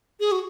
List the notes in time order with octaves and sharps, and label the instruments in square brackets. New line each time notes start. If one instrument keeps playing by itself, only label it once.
[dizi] G#4
F#4